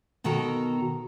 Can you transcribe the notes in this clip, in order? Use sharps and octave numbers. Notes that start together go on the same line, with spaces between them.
B2 D#3 F#4 A4 A#4 A#5